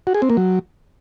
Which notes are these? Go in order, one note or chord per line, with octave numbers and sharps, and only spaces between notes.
F#4
G#4
C4
A#3
F#3